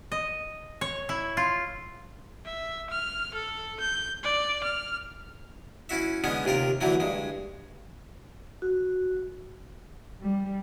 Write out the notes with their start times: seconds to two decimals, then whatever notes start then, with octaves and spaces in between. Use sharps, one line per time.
0.12 D#5
0.81 C#5
1.09 E4
1.37 F4
2.45 E5
2.90 F6
3.34 A4
3.80 G6
4.23 D5
4.63 F6
5.89 C#4 E4 F#4 E5
6.24 D3 G#3 B3 C#4
6.45 D#2 C3 F4 A#4
6.81 D2 D3 E3 F#3 A3 A#3
7.00 G2 G#3
8.62 F#4
10.21 G3